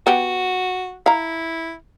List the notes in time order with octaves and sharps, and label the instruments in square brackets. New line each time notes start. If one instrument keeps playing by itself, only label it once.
[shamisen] B3 G4 [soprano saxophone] F#4
[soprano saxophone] E4 [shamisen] F5 A#5